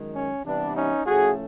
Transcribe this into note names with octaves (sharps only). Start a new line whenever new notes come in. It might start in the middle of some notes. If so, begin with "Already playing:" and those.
Already playing: F#2 D#3 G#3
C#4
C3 E3 G3 B3 D4
C#4 D#4
A2 F3 A3 C#4 F#4 G#4